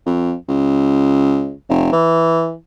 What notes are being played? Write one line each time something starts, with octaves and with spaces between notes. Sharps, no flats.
F2
C#2
F1
E3